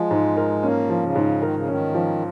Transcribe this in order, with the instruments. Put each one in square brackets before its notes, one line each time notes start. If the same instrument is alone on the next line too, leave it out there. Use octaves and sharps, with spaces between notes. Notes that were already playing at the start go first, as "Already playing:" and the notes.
Already playing: [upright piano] F3 [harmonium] G#3
[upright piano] G#2
A#4
[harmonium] A#3 [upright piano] C#4
[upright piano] F3
[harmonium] C#3
[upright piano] G#2
[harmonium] D#3 [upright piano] A#4
[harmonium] C#3
[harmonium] D#3 [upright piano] C#4
[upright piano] F3